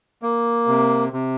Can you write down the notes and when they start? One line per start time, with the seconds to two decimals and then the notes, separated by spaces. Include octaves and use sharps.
0.23 A#3
0.67 C3
1.13 C3